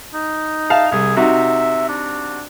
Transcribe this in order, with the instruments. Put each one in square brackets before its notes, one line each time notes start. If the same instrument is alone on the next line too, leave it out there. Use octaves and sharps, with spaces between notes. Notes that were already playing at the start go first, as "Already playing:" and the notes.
[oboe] D#4
[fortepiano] E5 F5 A5
[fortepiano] C2 [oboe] G#4
[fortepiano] C3 D#4 F#4 [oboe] E5
[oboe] D4